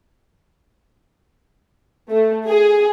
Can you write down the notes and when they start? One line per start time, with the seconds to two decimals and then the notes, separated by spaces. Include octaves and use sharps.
2.11 A3
2.47 G#4